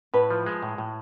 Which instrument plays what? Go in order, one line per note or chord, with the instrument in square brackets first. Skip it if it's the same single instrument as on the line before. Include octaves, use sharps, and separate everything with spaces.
[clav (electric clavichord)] A2 [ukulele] B4
[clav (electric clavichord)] F3
G#3
A2
A2